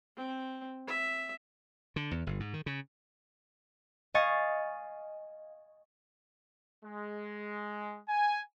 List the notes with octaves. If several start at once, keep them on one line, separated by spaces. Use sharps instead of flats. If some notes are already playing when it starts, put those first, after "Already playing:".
C4
E5
D3
E2
G1
G#2
D#3
C#3
D#5 F5 G#5 C#6 A6 C#7
G#3
G#5